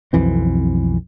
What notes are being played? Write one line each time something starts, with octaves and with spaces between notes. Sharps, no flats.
B1 F2 E3 C4